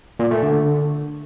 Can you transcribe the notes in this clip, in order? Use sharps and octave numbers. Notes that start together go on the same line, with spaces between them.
A#2
A3
D3